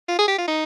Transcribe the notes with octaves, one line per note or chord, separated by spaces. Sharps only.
F4
G#4
G4
F4
D#4